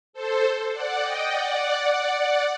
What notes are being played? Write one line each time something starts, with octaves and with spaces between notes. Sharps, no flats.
A4 C5
D5 F#5
D#5 G5
D5 F#5
D5 F#5
D5 F#5